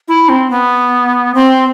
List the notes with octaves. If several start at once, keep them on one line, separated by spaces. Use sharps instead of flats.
E4
C4
B3
C4